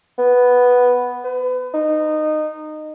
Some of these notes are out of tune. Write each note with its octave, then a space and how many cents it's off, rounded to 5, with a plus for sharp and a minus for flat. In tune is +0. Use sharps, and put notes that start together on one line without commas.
B3 +0
B4 +35
D#4 -20